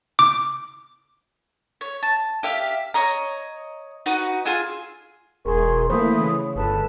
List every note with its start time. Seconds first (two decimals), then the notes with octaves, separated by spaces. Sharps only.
0.19 D6
1.81 C#5
2.03 A5
2.43 G4 E5 F5
2.94 C#5 D#5 A#5
4.06 D#4 F#4 B4 D#5
4.45 F4 G#4 G#5 E6
5.45 E1 G#4 A#4 C6 C#6
5.90 E3 A3 A#3 C5 B5 D#6
6.20 C#3
6.56 G1 A4 B4 A5